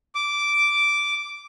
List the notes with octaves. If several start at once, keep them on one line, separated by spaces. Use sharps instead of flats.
D6